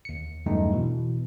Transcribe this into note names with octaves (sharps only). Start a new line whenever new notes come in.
D#2 C#7
E2 G2 C#3 F#3 A3 D#4
B2 E3